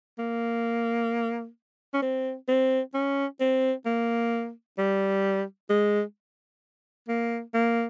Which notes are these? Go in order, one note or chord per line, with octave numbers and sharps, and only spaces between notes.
A#3
C#4
C4
C4
C#4
C4
A#3
G3
G#3
A#3
A#3